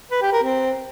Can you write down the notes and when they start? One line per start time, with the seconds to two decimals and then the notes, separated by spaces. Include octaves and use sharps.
0.11 B4
0.22 G4
0.32 A#4
0.43 C4